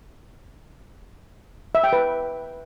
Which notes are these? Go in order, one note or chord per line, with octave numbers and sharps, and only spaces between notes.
E5
G5
B4